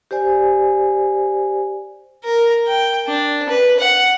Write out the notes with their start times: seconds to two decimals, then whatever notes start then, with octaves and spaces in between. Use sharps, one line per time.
0.11 G4 C5 D5 G#5
2.24 A#4
2.66 G5
3.07 D4
3.49 B4
3.79 F#5